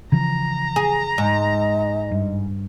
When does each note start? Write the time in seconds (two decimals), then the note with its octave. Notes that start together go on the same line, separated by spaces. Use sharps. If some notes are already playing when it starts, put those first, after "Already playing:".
0.12 C#3 E3 F3 A#5
0.76 G#4
1.18 G#2 D#5
2.11 G2